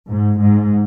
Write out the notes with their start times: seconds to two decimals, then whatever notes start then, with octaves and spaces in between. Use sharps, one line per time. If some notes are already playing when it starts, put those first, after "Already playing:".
0.11 G#2
0.39 G#2